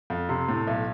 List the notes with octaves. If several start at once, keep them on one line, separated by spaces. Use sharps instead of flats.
F2
C3
A2
B1